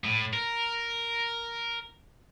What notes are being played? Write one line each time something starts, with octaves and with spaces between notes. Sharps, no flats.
A2
A#4